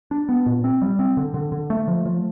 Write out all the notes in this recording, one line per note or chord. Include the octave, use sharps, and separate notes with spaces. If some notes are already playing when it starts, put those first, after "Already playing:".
D4
B3
A#2
C4
G3
C4
D3
D3
D3
A3
F3
F3